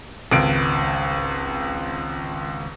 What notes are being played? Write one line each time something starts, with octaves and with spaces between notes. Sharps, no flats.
G#1 C#2 D7